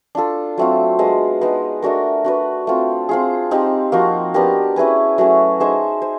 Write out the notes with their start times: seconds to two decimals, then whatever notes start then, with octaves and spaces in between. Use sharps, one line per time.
0.15 D4 F4 A4
0.58 F#3 A3 C4 F4
0.99 G#3 B3 D4
1.41 G#3 B3 D#4
1.82 A3 D4 F#4 A#4
2.24 D4 F#4 B4
2.67 A3 C4 F4
3.09 C4 F4 G#4
3.51 C4 D#4 G4
3.92 F3 A#3 D#4 F#4
4.34 B3 D4 G4 A#4
4.76 C#4 E4 G#4 B4
5.18 F#3 A3 C#4
5.60 D#4 G#4 C5 E5
6.02 C5